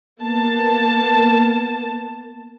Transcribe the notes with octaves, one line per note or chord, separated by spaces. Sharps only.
A#3 B3 A5